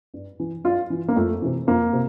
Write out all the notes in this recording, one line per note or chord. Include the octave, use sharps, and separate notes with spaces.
G2
E3
G2 F4
E3
A#3
F2 A3
C3 E3
F2 A#3
C3